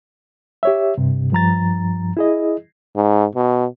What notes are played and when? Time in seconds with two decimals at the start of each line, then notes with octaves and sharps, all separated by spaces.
0.63 G4 C#5 E5
0.98 G2 C3
1.32 G2 F3 A#5 A6
2.17 E4 G#4 D#5
2.96 G#2
3.35 B2